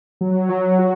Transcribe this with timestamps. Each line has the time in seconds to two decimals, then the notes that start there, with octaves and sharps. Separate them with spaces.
0.21 F#3
0.49 F#3
0.79 F#4